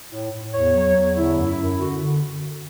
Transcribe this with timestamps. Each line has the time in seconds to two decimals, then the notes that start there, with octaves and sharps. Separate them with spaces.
0.10 A2
0.31 A2
0.52 E2 C#5
0.74 F#3
0.95 E2
1.15 D3 E4
1.36 F#2
1.47 E4
1.57 F#2
1.78 D3 F#4
1.99 D3